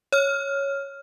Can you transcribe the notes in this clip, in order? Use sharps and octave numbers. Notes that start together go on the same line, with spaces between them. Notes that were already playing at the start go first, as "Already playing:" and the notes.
C#5 F6